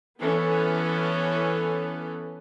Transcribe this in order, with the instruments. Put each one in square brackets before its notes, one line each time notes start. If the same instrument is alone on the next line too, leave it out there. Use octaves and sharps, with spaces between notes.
[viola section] E3 B3 C#4 A4